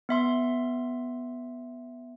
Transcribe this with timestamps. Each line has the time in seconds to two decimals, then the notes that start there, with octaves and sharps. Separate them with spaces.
0.09 B3 E5 C6